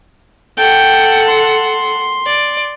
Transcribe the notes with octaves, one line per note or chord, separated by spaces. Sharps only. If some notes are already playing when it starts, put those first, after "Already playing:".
A4 F#5 G5
C6
D5